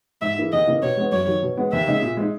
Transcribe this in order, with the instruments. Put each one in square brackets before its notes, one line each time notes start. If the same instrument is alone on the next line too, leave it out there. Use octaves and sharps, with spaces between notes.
[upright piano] G#2 [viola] E5
[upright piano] E3 A#3 E4 G#4
[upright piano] D#2 [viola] D#5
[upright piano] C#3 E3 A#3
[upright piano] B2 [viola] C#5
[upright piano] G#3 B3
[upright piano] F#2 [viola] C#5
[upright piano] D#3 F#3
B2
G#3 B3
[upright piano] D#2 [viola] E5
[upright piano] C#3 G#3 D#4 G#4
A#2
G#3 D#4